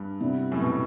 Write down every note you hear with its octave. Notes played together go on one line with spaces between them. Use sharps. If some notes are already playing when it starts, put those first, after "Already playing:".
Already playing: G2
C3 G3 B3 E4
F#2 A2
B2